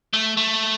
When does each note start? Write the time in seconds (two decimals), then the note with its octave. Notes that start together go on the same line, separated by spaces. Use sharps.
0.13 A3
0.37 A3